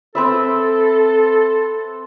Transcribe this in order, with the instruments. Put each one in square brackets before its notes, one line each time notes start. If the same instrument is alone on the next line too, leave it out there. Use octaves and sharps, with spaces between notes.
[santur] C4 B4 E5 [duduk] A4